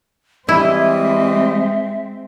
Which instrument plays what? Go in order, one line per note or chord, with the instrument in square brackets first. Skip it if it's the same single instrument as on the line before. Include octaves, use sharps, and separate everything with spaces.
[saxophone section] E3 G3 D#5 [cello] G#3 C4 [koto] E4 [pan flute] E5